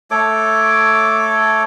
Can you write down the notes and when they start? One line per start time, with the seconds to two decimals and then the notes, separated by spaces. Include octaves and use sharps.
0.11 A3 A4 C#5 D6